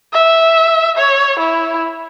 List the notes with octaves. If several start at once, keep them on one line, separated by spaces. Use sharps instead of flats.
E5
C#5
E4